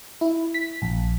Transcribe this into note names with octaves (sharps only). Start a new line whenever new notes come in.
E4
B6
A#1